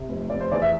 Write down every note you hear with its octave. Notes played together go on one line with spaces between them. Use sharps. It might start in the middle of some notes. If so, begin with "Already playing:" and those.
Already playing: C3
F1
F1 D5
C5
E2 D5
E5